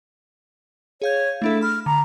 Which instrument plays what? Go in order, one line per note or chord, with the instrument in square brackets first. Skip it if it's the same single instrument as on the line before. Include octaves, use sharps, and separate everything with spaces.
[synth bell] G#4 F5 G6 [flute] C#5
[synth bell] A3 D4 A4 [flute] E4
[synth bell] B5 [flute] F6
[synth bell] D3 [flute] A#5